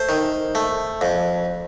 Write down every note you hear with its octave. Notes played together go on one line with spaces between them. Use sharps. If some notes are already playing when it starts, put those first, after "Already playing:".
Already playing: A3 C5
D#3
A3
F2